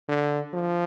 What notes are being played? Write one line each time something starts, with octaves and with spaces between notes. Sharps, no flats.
D3
F3